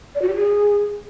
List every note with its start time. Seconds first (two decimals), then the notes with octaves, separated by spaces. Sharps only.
0.15 D5
0.22 F#4
0.29 G4
0.36 G#4